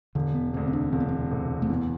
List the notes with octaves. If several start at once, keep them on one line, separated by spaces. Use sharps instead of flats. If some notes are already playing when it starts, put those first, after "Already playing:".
E1 D3
B3
D2 C3 C4
C4
D4
E1 C4
B3
C4
D2 C3
A3
E2 B3